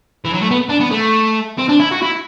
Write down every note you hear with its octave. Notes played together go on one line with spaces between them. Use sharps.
E3
F#3
A3
B3
D4
B3
A3
C4
D4
E4
F#4
E4